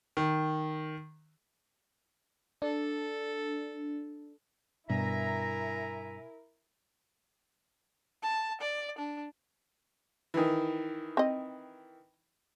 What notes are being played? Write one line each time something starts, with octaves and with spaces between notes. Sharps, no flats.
D#3
D4 A4
G2 B2 E4 A#4 E5 G#5 A#5
A5
D5
D4
D#3 E3
C4 D#5